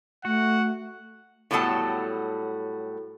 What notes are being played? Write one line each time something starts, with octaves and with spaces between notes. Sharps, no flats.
A3 F#4 F#5
A2 F#3 G3 B3 A4 A5